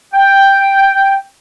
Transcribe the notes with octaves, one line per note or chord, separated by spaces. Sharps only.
G5